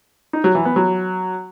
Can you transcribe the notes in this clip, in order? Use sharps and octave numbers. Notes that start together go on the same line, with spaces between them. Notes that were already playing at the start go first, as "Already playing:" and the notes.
D#4
F#3
E3
B3
F#3